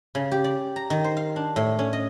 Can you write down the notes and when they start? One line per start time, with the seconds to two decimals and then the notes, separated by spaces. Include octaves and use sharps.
0.15 C#3
0.31 G4
0.44 D5
0.76 A#5
0.90 D#3
1.04 C5
1.17 F5
1.36 D4
1.56 A2
1.79 C#4
1.93 D#5